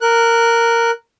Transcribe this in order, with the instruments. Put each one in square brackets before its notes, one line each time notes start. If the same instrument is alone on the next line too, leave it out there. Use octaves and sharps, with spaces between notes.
[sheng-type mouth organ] A#4 F#6